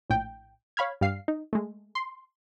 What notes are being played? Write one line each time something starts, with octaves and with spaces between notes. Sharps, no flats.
A#1 A2 G5
C#5 F5 B5 F6 G#6
G2 G3 F5 C7
D#4
G#3 A3
C6